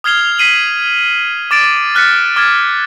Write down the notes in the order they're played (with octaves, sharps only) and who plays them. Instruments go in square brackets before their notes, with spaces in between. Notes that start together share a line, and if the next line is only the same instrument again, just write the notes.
[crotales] D#6 F6 G#6 C7 F7 G7
B6 C7 D#7 F#7
D6 A6 D7 F7
F6 F#6 A6 B6 C#7
D6 F6 G#6 A6